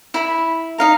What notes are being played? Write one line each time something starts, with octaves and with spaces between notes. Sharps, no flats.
E4 B5
D#4 F5 A#5